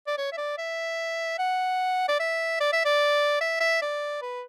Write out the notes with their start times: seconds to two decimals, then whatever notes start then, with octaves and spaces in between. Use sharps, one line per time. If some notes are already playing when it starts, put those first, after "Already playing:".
0.07 D5
0.18 C#5
0.32 E5
0.37 D5
0.58 E5
1.39 F#5
2.08 D5
2.19 E5
2.60 D5
2.72 E5
2.85 D5
3.41 E5
3.60 E5
3.82 D5
4.22 B4